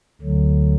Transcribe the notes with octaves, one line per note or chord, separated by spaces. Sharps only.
D2 D3 F#3